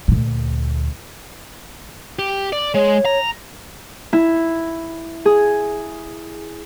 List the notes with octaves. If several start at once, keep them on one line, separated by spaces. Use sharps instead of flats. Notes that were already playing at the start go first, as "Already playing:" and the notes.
D2 A#2
G4
D5
G#3 C#5
A#5
E4
G#4